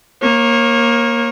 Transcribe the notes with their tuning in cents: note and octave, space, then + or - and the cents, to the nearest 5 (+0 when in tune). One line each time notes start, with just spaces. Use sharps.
A#3 +10 C#5 -30